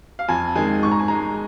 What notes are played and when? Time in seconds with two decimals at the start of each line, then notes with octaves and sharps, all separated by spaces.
0.19 F5
0.28 F2 G#5
0.55 D#3 G#3 G#5
0.83 G#2 C#6
0.91 A#5
1.00 G#5
1.08 G#3 A#5